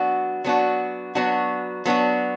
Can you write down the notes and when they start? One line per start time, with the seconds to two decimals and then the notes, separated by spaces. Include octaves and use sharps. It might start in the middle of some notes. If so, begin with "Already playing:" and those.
Already playing: F#3 B3 D4 F#4
0.44 F#3 B3 D4 F#4
1.15 F#3 B3 D4 F#4
1.85 F#3 B3 D4 F#4